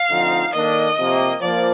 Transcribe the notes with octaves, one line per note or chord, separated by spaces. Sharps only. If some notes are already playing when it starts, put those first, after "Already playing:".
Already playing: F5
D2 D3 F3 C4 D#4
D#3 A#3 D4 A4 D#5
C3 F3 A#3
F3 A#3 D5